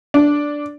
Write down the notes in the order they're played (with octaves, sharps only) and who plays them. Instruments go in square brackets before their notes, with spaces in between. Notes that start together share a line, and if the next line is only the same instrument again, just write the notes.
[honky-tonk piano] D4